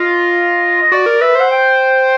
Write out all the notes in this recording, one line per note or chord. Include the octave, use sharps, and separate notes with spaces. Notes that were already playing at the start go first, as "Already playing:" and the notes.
Already playing: F4 D#5
D#5
F#4 D5
A#4
B4 E5
C5 F#5
G5